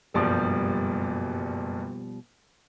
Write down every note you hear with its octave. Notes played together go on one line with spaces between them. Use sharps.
F#1 G2 B2 F3 G3 D5